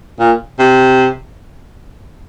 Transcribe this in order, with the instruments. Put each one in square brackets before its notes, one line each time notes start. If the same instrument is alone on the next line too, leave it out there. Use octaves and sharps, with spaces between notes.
[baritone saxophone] A#2
C3